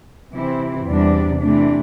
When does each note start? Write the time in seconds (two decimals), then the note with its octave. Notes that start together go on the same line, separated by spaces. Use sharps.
0.33 C3 E3 C4 E4
0.87 E2 C3 G3 D4
1.41 C3 E3 A3 D4